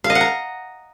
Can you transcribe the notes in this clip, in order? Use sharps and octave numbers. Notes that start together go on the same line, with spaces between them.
F5
D#5
F#5
A#5